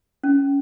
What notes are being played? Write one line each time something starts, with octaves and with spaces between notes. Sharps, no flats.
C#4